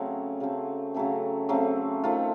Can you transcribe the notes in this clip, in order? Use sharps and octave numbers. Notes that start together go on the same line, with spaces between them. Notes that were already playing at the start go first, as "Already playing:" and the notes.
Already playing: C#3 F#3 A3 C4
C#3 F#3 A3 C4
C#3 F#3 A3 C4
C#3 F#3 A3 C4
D#3 A3 C4 F4